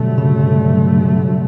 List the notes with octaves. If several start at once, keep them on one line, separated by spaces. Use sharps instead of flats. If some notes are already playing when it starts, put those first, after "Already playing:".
Already playing: G2 B2 D3 F#3 A3
C#3